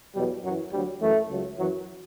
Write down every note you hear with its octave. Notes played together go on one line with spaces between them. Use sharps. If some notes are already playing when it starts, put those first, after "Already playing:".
E2 B2 F#3 G3
F#2 E3 F#3
D2 D3 F#3 G3
F#2 E3 A3
C#2 C#3 F#3
F#2 E3 F#3